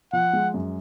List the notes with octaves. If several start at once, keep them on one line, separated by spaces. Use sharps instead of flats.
F3 F#5
G#3
F#2